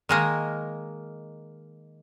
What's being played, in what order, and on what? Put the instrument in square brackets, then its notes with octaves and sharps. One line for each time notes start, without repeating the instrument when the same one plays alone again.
[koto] D#3 G#3 A#3